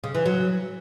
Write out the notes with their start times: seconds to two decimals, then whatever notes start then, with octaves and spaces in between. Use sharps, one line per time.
0.04 C#3
0.15 E3
0.26 F#3